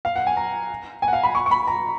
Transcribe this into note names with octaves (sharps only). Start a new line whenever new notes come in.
F5
F#5
G#5
A#5
G#5
F#5
F5
B5
C#6
C#6
B5
A#5